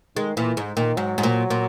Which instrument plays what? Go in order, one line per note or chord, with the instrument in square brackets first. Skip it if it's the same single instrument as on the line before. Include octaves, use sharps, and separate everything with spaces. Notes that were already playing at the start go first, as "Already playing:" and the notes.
[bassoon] D#3 [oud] G#3
[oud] A#2 [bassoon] E3
[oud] G#2
[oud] A#2 [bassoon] D#3
[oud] G#2 [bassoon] F#3
[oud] G#2
A#2
A#2